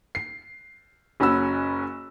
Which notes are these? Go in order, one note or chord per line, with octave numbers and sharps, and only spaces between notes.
C7
F#1 C#4 F#4 B5 E6